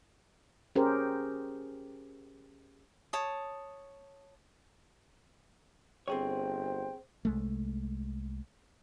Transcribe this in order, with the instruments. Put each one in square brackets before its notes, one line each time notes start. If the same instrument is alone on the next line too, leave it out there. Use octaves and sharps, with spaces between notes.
[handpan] C#4 G4 G#4 A#4 C5
[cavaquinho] C#5 A5 D#6
[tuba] G1 [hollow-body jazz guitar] C4 G#4 C#5 [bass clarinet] C5 [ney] G5
[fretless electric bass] C2 G#3 A3